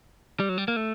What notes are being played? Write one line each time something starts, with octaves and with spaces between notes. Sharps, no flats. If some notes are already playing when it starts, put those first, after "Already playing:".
G3
F#3
G3
A#3
A3